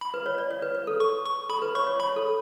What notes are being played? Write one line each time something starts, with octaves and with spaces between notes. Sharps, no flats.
B5
B4
C#5
D5
C#5
B4
B4
A4
C#6
C#6
A4 B5
B4
C#5 C#6
C#5
C#5 B5
A4